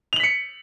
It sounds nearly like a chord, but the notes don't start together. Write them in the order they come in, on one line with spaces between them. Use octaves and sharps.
F7 F#7 B6 C#7